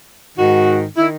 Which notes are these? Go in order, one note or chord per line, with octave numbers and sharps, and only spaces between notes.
G#2 D#3 F#4
D#3 E4